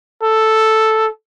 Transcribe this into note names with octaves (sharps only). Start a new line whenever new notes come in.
A4